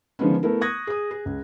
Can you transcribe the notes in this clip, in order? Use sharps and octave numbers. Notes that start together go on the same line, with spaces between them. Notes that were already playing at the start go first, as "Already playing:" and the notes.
D3 D#3 F3 G#3 B3 C#4
A3 B3 E4 A#4
C#6 D#6 F#6 G#6 A#6
G#4 D#6
G#4
C#2